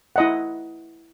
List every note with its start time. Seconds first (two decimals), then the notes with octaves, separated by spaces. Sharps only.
0.16 E4 D#5 F#5